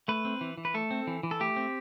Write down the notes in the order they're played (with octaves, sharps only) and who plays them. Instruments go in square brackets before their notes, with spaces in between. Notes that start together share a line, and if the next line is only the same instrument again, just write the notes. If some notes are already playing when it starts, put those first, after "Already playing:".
[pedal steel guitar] A3 B4
C4
E3
E3
B4
A3 A4
C4
E3
E3
A4
A3 G4
C4